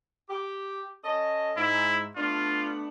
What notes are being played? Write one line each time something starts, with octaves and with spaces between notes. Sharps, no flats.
G4
C#4 A4 D#5
G#2 E4
A3 B3 D4 F4